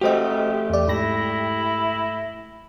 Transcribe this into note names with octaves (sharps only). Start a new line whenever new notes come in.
A3 F#4 G4 C5 D#5
E2 D5
G#2 E4 A#6